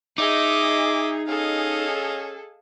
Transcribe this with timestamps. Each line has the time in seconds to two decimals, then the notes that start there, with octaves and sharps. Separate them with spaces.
0.18 D#4 G#4 D#5 E5 D6
1.28 C#4 G#4 A4 D#5 F5